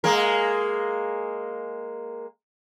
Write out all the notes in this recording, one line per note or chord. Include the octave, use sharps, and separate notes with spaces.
G#3 A#3 A#4